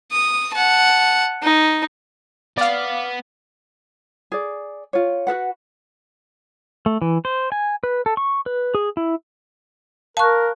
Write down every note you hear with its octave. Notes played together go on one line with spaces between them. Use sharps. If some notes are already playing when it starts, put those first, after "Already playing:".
D#6
F#5 A5
D#4
B3 D5 F5
G#4 D5
F4 C#5
F#4 A4 B4 F#5
A3
E3
C5
G#5
B4
A4
C#6
B4
G#4
E4
A#4 F5 A5 C#6 F#6